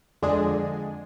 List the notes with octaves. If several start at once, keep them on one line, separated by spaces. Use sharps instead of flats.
F2 D3 G#3 D4 G#4